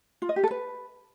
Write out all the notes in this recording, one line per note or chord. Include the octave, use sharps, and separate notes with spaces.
F4
D#5
G4
A4
B4